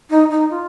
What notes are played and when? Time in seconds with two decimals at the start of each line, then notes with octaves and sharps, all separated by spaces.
0.10 D#4
0.31 D#4
0.50 F4